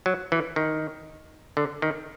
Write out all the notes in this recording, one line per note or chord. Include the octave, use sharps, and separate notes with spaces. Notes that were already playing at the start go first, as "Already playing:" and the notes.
F#3
E3
D#3
D3
D#3